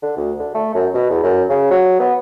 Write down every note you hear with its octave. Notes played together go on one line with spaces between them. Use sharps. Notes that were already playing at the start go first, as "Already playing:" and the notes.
D3
D2
D3
A3
F#2
B2
E2
F#2
C#3
F#3
B3